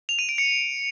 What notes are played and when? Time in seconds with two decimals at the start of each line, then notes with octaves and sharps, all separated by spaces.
0.09 F7
0.19 D#7
0.29 D7
0.38 C#7